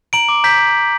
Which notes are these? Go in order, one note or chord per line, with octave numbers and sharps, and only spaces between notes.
A#5 D7 F#7
D6
A#5 G6 B6